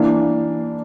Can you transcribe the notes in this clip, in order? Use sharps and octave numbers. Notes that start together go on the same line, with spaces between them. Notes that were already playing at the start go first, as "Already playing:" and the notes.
Already playing: E3 A#3 D4